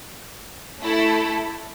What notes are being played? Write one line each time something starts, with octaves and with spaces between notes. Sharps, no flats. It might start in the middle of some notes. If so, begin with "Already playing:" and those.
A3 E4 A4